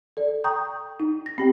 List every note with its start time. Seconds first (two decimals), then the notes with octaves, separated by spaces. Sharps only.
0.17 A4 D5
0.44 G5 A#5 C#6 D#6 G6
1.00 D#4
1.26 A#6
1.38 C4 G4 G5